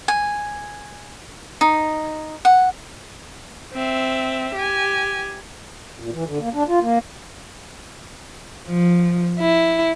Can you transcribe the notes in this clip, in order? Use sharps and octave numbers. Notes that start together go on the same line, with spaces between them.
G#5
D#4
F#5
C4 E5
G4 G#5
A#2
E3
D3
A#3
D4
F4
A#3
F3
E4